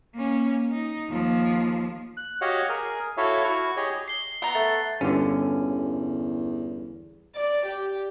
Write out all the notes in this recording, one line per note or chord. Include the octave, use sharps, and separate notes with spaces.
A#3 C#4
D#4
D#2 F3
F#6
F#4 G4 C#5 D#5 F5 F#5
G#4 A#4 G#5
E4 F#4 A4 C#5 E5 F5
E4 F#4 C#6
G4 G#4 C#5 D#5
C7 G7
B3 A#5
A3 A6
G1 E2 D3 C#4
D5
G4